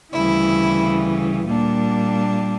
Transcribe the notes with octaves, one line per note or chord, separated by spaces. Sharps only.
D2 C#3 E3 G3 E4
A#2 G3 A#3 D4